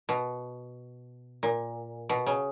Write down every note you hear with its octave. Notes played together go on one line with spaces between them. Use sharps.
B2
A#2
B2
C#3